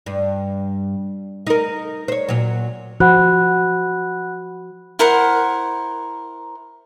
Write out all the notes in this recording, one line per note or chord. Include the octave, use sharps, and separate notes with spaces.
G2
D#4 A#4
C5 C#5
A#2 F#3
F3 F#4 C5 F#5 B5 F#6
E4 A#4 C5 F#5